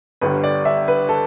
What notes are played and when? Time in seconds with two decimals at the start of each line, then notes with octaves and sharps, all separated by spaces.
0.21 G1 G2 D3 G3 B4
0.44 D5
0.65 E5
0.88 B4
1.09 A4